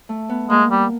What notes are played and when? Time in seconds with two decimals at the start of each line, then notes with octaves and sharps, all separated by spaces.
0.09 A3
0.29 B3
0.50 G#3 A#3
0.71 G3